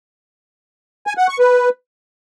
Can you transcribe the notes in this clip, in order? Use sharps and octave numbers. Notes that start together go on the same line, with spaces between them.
G#5
F#5
C#6
B4